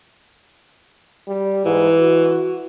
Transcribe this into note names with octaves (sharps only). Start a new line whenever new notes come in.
G3
G#2 E3
F#4